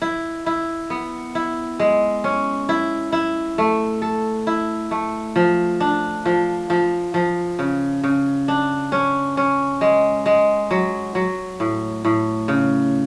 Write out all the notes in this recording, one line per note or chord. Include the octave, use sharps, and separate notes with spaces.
E4
E4
B3
E4
G#3
C#4
E4
E4
A3
A4
E4
A3
F3
D4
F3
F3
F3
C#3
C#3
D4
C#4
C#4
G#3
G#3
F#3
F#3
A2
A2
C#3